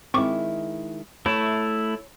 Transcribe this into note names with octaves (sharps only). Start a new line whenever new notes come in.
D#3 G#3 C4 E4 C#6 D6
A3 E4 C#5